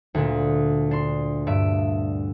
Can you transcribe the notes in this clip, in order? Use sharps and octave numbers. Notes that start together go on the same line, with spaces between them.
D2 A#2
D4 C6
G2 E5 D7